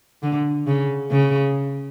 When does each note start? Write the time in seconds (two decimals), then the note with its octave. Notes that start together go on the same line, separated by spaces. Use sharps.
0.22 D3
0.67 C#3
1.11 C#3